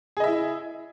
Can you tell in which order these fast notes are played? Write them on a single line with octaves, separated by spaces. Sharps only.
G#4 D#5 E5 E4